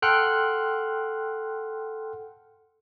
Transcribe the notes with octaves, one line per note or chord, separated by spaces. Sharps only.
A4 F#5 G5 C6 F6 F#6